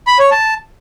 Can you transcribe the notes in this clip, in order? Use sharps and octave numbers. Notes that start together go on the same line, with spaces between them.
B5
C#5
A5